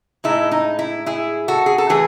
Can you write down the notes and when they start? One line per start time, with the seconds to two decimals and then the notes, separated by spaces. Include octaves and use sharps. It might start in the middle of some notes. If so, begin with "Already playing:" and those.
0.24 A2 G#3 D#4 E4
0.51 D#4
0.79 E4
1.06 E4 G#4
1.48 F#4 A4
1.66 G#4
1.78 A4
1.89 A2 E3 A3 G#4 B4